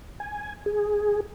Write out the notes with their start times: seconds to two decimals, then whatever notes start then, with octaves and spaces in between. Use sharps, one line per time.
0.20 G#5
0.66 G#4